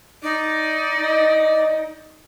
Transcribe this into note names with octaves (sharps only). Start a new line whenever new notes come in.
D#4 D5
D#5